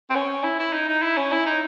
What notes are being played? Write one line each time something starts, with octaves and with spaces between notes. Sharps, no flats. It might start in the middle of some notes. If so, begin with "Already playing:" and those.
C4
C#4
E4
E4
D#4
D#4
E4
C#4
E4
D#4